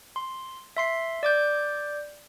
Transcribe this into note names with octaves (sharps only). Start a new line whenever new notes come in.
C6
E5 C6 C7
D5 D6 G6